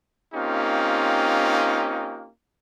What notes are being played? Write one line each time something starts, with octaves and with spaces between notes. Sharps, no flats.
A#3 C4 C#4 D#4 F4 G4